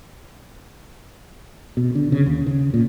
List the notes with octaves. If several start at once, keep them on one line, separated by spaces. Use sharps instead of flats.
B2
D3
C#3
D#2
C#3
A#2